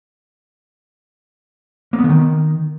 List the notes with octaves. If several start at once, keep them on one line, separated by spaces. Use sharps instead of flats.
A#3
B3
D3
D#3